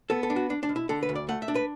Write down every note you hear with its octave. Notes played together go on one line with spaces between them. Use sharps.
B3 A4
A4
D4
F#4
D4
D4
B2
E4
D3 A4
B4
D2
D5
A3 F#5
E5
D4
B4